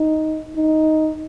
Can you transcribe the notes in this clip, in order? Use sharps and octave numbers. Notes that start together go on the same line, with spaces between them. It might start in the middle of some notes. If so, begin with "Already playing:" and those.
Already playing: D#4
D#4